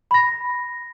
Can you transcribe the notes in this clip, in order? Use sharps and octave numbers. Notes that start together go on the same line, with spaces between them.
B5 A#6